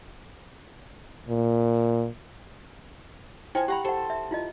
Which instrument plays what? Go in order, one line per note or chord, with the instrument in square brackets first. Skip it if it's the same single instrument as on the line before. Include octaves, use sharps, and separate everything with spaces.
[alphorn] A#2
[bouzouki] F3 G#5 [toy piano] E4 G5
[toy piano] G4 G5 B5 [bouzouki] F#5 A#5
[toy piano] G4 F#5 [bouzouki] A4 C5
[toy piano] E5
E4 F4 D#5